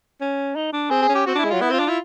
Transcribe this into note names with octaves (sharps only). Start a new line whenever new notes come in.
C#4
D#4
D4
C4 G#4
G#4
C#4
G4
C4 F#4
D4 E4
G#3
F#3 F4
B3 E4
C4 F4
D4
E4 F4